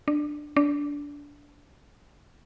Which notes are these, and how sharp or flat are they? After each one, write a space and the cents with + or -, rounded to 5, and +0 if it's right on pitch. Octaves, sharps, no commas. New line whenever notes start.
D4 +15
D4 -20